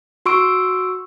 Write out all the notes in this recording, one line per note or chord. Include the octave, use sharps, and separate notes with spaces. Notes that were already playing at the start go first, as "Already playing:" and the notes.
F#4 C6 C#6 E6 D7